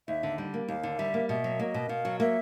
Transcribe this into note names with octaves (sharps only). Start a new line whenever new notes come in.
D#2 E5
D3
G3
A#3
D#2 F5
D3
G3 E5
A#3
B2 E5
F#3
A#3 D#5
B2
B2 F5
F#3
A#3 E5